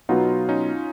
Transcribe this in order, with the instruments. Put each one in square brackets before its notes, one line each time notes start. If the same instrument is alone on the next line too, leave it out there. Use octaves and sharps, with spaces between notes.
[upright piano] B2 F#3 B3 [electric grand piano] D#4 F4
[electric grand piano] C#4 D#4